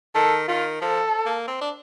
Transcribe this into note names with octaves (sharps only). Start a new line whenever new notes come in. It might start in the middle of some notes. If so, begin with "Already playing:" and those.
D#3 A4
D#3 F4
F3 A4
A#3
C4
D4